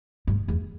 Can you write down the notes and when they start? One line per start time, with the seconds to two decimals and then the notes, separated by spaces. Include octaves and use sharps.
0.27 G2
0.48 E2